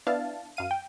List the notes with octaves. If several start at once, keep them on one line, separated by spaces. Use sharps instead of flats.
B3 D4 E4 F5 A5
F#2 F5 D#7
G5